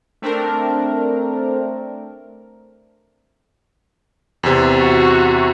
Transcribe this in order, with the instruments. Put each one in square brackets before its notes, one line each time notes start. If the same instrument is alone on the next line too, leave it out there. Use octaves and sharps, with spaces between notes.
[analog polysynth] A3 C4 D4 A#4
[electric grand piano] E2 C3
[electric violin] F#4